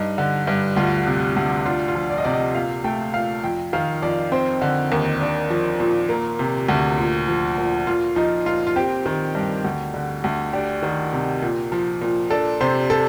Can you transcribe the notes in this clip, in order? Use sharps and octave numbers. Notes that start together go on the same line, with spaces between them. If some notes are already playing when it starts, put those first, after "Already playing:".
Already playing: G2 D#4
D3
G2
D2 F4
C3
D2
D4 F4
F4
F3
D5
D#5
C3 D5
D#5
A#2 F5
A3 G5
A#2 F5
F2 G5
D#3 F5
F2 D5
C4 C5
D3
D#2
D4
F3
A#2
A#3
C3
D2
A#2
F3
A#2
A#2 F4
F3 D#4
A#2 F4
F4
C4 G4
D#3
G2
D2
D3
D2
D4 G4
D#3
C3
A#2
F3
A#2
D4 A4
C3 C5
A4